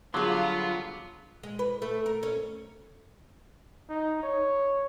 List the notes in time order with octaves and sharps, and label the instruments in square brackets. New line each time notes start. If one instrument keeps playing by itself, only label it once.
[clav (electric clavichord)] D3 F#3 G3 [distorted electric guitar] B3 [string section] F4 [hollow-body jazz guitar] G#4 C6
[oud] G#3
B4
A3
A#4
C#4
[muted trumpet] D#4
C#5